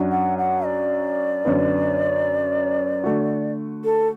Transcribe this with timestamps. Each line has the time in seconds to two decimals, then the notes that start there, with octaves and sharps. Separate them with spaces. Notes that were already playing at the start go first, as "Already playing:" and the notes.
Already playing: F#2 F#3 D4 F#4
0.11 F#5
0.38 F#5
0.65 D5
1.45 F#2 D3 B3
3.04 D3 A3 F#4
3.84 A4